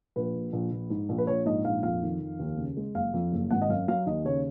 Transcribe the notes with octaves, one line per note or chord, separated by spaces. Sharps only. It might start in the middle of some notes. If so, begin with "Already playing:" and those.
A#1 B4
A#2
A#1
A#1
G#2
A#1
B4
A#1 C#5
G#2 D#5
A#1 F5
F2 F5
D#3
F2
D#2
C#3
G#3
F#1 F5
F2
F#1
G#1 F#5
D#5
F#2 F5
F#3 F5
D#2 D#5
C#3 C#5